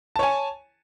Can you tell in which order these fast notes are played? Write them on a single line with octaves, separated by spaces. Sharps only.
A5 C#5 G#5